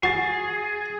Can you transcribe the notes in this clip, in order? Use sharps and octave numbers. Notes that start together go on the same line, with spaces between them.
F#4 G#4 A6 C7